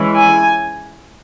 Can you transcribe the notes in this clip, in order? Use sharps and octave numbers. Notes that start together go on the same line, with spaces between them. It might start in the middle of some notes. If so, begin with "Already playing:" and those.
Already playing: E3 G#3 C#4 E4
G#5